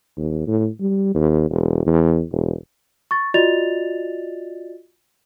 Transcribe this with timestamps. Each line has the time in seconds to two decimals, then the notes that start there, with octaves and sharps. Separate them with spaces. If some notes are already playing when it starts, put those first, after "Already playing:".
0.17 D#2
0.47 A2
0.81 G3
1.14 D#2
1.50 E1
1.86 E2
2.32 E1
3.11 C#6 A6
3.34 F4 F#4 D5 D#5 A6 F7